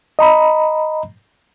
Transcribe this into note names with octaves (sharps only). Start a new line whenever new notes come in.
D#5 A#5 B5